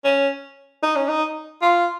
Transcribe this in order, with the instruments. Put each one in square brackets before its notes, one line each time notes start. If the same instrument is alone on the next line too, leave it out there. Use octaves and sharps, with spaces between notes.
[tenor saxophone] C#4
D#4
C#4
D#4
F4